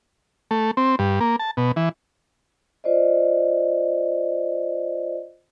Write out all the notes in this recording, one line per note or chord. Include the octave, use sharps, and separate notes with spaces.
A3
C4
G2
A#3
A5
B2
E3
F4 C5 D5 D#5